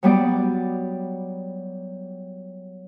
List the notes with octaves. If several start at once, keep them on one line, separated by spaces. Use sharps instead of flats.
F#3 G3 B3 D5